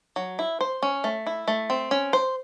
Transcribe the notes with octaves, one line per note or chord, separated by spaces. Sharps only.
F#3
E4
C5
C#4
A3
E4
A3
C4
C#4
C5